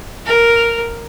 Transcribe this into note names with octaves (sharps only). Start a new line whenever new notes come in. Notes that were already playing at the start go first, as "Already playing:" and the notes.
A#4